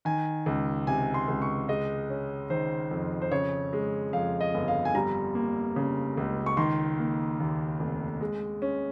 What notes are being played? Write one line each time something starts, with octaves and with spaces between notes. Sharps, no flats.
D#3 G#5
C#2
C3 G#5
C6
C#2
C#6
G#3 D#5
C#4
D#3 C5
F2
C5
C#3 C#5
G#3
F2 F5
D#5
G1
F5
G#5
G3 A#5
A#3
C#3
C#2
C#6
D#3 C6
A#3
D#2
F1
G#3
C#4